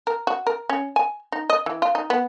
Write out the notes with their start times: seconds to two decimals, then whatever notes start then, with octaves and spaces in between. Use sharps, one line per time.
0.07 A#4
0.27 F#4
0.47 A#4
0.69 C#4
0.96 G#5
1.32 D#4
1.50 D#5
1.66 E3
1.82 F4
1.95 D#4
2.10 B3